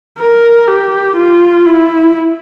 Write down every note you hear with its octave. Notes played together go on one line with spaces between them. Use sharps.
A#4
G4
F4
E4